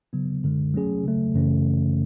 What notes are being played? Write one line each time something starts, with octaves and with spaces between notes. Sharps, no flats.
C#3 F#3 B3
F#2 D3 G#3
F#3 A3 C#4 G#4
C#3 F#3 A3
F#2 C#3 E3 A3 C#4